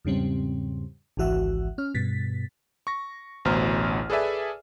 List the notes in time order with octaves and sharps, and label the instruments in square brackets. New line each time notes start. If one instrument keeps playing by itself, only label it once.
[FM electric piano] E2 G#2 C#3 G3 C4
G#1 C#2 E3 F#4 E5 F#5
C#4 F6
G2 B2 A6 B6
[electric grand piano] C#6 A#6
A1 D2 B2 C5 A#5 F6
G#4 A4 B4 D5 E5 G#5